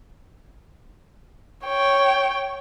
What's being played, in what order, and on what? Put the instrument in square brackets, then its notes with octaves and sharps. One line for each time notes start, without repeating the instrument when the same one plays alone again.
[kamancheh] C#5 G5